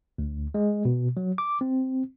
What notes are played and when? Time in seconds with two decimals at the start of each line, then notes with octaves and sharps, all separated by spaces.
0.18 D2
0.54 G#3
0.85 B2
1.17 F#3
1.38 D6
1.61 C4